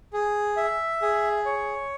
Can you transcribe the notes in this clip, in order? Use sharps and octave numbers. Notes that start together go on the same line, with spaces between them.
G#4
E5
G#4
C#5